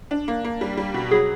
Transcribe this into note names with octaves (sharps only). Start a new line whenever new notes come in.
D4
A#3
A#3
G3
G3
B2
F#3 G#4